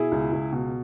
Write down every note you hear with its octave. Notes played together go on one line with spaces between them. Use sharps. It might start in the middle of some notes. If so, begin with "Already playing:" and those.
Already playing: B2 E4 G#4
C#2
C#2
B2